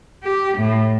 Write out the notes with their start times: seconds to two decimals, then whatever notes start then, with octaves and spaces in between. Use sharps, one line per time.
0.24 G4
0.58 A2